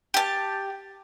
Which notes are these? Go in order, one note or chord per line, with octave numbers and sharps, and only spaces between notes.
G4 A5